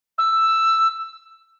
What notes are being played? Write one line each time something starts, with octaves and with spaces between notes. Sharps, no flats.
E6